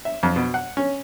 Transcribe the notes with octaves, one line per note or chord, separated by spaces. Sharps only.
E5
F2
B2
F#5
C#4